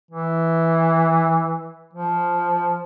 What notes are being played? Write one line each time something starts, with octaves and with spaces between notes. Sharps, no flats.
E3
F3